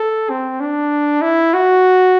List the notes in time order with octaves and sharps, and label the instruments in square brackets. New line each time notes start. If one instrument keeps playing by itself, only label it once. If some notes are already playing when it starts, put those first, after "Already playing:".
Already playing: [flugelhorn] A4
C4
D4
E4
F#4